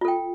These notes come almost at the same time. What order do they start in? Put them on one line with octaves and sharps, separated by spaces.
F4 A4 G5